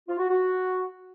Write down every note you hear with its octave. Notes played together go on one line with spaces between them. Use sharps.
F4
F#4
F#4